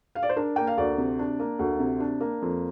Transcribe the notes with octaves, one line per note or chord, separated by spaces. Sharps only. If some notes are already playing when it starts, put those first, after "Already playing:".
F5
D5
C5
D4 A#4
A#3 G5
F5
D2 D5
C3
D4
A#3
D2
C3
D4
A#3
F2